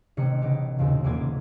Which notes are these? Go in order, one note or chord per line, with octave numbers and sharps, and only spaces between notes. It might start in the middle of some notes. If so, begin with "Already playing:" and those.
A1 C3 D#3 C#4 C#7
C#3 B3 D#4 G4
E1 D#2 A#2 C#3 C4
D#1 G#1 E3 A#3 D5 G#6